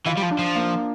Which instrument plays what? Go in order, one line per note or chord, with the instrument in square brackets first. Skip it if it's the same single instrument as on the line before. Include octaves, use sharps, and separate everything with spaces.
[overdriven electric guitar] E3 [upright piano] F4
[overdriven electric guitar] G3
F3
[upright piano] D4
[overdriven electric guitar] F3
[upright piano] A#3